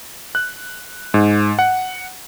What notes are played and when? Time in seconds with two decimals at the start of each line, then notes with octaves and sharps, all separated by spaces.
0.35 F#6
1.14 G#2
1.59 F#5